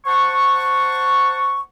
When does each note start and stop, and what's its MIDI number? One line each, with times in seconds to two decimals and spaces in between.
0.06 1.60 72
0.06 1.60 78
0.06 1.60 81
0.06 1.60 85